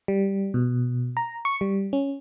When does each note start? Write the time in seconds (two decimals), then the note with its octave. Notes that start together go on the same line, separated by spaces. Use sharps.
0.08 G3
0.54 B2
1.17 A#5
1.45 C#6
1.61 G3
1.93 C#4